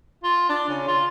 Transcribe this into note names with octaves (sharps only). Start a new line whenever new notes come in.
F4
D4
C#3
F4